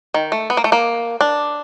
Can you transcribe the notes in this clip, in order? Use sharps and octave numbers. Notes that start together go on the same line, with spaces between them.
D#3
A3
B3
A#3
A3
A#3
D4